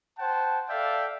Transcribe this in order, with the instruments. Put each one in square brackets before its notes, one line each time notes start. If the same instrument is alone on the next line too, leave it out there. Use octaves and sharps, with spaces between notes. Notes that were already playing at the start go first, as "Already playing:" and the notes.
[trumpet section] C5 F#5 G5 A5
A4 D5 E5 F5 G5